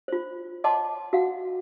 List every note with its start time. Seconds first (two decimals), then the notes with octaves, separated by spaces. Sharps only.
0.08 F4 C5
0.64 C#5 D#5 F#5 A5 C6 D6
1.13 F#4 F5 F#5